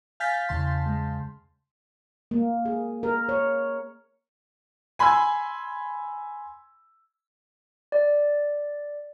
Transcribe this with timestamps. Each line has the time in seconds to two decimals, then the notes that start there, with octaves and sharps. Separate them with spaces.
0.20 F5 G#5 F6 G6 A6 B6
0.49 E2 C#3 A5 C6
0.86 G#3
2.31 A#3
2.65 G#4
3.03 A#4
3.29 C#5
4.99 G#5 B5 C6 E6 G#6
7.92 D5